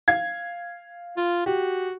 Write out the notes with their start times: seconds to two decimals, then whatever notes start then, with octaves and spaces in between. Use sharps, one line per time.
0.08 F5 G#6
1.17 F4
1.46 F#4 G4